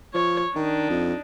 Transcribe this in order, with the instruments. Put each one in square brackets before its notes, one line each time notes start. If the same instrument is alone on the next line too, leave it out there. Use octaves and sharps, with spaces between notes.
[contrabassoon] F3 [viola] C#5
[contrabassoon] D#3 [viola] D4 D#4
[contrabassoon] F2